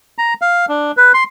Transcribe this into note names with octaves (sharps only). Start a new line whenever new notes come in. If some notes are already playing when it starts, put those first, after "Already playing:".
A#5
F5
D4
B4
C6